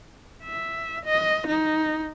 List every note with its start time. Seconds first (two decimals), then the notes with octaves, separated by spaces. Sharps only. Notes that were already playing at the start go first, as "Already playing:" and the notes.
0.44 E5
1.05 D#5
1.47 D#4